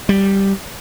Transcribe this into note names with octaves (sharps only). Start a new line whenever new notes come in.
G3